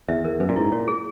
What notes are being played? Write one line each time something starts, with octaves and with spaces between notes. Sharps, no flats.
E2 E5
E2 A#4
F#2 B4
A#2
G#2 E4
A#2 C#5
G#4